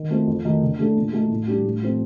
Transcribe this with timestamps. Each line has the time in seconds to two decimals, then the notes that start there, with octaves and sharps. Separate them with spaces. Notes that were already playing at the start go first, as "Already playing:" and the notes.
Already playing: D#3
0.11 A3 C4 F4
0.27 F2
0.45 D#3 A3 D#4
0.62 D3
0.79 A3 D4 A4
0.96 A#2
1.13 A3 D#4 A4
1.30 A2
1.47 G3 D4 G4
1.64 A2
1.82 F3 A3 C4